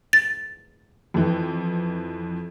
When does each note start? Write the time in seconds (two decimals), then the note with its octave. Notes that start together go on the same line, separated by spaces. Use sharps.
0.13 A6
1.14 F2 E3